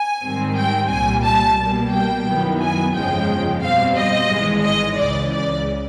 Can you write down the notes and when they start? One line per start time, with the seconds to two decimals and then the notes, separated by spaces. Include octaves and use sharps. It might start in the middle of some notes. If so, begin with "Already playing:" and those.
Already playing: G#5
0.23 G#2 D#3 G3 C4
0.56 G5
0.90 C2 A#2 G3 G#5
1.24 A5
1.58 B2 G3 A#3
1.92 G5
2.26 F#2 D#3 F#3 B3 E4
2.61 G#5
2.95 G1 F2 C#3 F3 G#3 G5
3.63 B2 G3 C4 F5
3.96 D#5
4.30 G#1 G#2 E3 G#3
4.65 D#5
4.98 C#2 C#3 E3 D5
5.33 D5